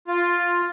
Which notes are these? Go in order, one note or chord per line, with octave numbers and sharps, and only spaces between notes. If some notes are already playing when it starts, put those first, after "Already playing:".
F4